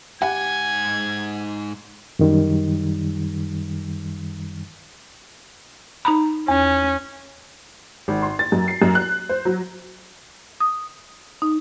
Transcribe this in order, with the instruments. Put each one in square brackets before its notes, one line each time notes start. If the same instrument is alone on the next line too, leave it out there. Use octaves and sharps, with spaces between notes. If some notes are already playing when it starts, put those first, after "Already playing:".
[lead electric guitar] G#2 G#5 [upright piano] G4 F#5 [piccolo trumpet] G#6
[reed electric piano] F#2 D#3 G3
[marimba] D#4 A#5 B5
[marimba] E2 [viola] C#4
[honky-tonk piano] G#1
C6
A6
F#2
C7
F#2
F#6
C5
F#3
[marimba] D#6
D#4